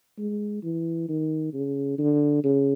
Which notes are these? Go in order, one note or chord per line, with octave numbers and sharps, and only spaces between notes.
G#3
E3
D#3
C#3
D3
C#3